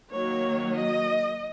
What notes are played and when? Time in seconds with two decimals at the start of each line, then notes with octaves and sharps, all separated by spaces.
0.12 D#3 F#3 A#3 C#5
0.76 D#5